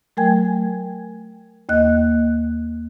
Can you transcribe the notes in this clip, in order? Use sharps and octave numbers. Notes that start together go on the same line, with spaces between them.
F#3 A3 A#4 G5 G#5 G#6
D#2 A#3 D#5 F#6